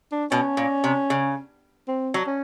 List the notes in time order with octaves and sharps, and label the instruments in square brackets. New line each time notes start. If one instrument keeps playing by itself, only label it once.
[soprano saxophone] D4
[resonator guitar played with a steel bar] B2 [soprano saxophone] C#4
[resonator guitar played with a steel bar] A#2
C3
C#3
[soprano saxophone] C4
[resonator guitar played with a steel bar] F#3
[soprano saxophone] C#4